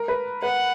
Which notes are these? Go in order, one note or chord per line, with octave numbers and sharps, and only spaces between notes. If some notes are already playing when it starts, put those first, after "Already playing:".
Already playing: A#4
B4
B4 F#5